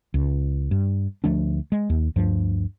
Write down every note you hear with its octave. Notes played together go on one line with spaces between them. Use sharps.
C#2
G2
D2 F3 A3 D4
G#3
D#2
D2 G2 F3